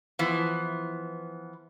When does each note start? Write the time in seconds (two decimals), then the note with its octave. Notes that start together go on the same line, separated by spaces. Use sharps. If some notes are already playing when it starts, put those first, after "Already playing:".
0.19 E3 F3 B3